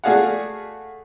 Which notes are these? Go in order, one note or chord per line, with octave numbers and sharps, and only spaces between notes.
A3 F#4 G#4 D5 F5 F#5